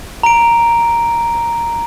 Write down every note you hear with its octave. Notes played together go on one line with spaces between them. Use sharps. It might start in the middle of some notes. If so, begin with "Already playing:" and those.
A#5 D7